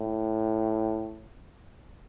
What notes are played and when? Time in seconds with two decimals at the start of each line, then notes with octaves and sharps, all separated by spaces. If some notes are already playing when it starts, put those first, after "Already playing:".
Already playing: A2